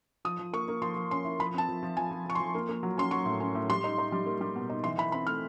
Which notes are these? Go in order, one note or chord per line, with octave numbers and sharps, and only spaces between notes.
F3 D#6
F3
A#3 C#6
A#3
F3 C6
F3
C#4 C6
E4
F3 B5
C4 A5
F3
F3
F3 G#5
F3
F3 C#6
C6
F3
A#3
A#3
F#3
C#4 C6
F#3 C#6
A2
C#4
A2
G3 C6
D#4
D#4
G3
A#3
G3
B2
D#4
E3 C6
E3 B5
C4 B5
A3 F6